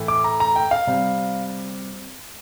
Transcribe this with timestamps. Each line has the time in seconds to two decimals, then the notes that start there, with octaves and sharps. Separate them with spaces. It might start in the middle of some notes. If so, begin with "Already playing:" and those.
Already playing: A2 E3 A3
0.08 D6
0.24 A#5
0.40 A#5
0.56 G5
0.71 F5
0.87 C3 G3